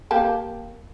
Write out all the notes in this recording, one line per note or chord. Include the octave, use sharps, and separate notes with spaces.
A#3 G4 A5